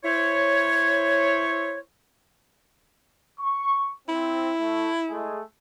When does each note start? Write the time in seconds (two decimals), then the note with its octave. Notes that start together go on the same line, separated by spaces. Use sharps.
0.04 E4 C5 C#5
3.41 C#6
4.09 C4 E4
4.60 A3
5.10 G#3 A3 G#4